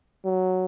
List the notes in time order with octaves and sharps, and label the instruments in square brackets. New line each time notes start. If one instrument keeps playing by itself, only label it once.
[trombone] F#3